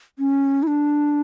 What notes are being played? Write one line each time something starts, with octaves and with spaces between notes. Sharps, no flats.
C#4
E4
D4